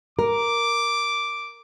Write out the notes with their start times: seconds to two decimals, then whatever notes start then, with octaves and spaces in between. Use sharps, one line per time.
0.19 A#4 D6